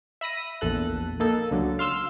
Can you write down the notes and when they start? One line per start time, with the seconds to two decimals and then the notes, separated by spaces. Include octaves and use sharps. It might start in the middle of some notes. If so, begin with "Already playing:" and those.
0.21 E5 B5 A#6 D#7
0.61 A#1 E2 A4 F#6
1.20 A#3 D#4 A4
1.51 C#2 D3 F#3
1.79 F5 C6 E6 F6